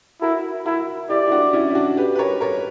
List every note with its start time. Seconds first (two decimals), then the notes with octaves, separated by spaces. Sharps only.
0.22 E4 F#4 A#4
0.65 E4 F#4 A#4
1.10 E4 G4 D5
1.28 E4
1.31 D4 F#4
1.53 C#4 E4
1.70 E4
1.75 D4 F#4
1.97 G4 B4
2.15 B4
2.19 A#4 C#5
2.41 A#4 C#5